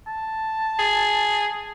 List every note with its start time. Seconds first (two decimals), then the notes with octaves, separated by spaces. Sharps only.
0.07 A5
0.79 G#4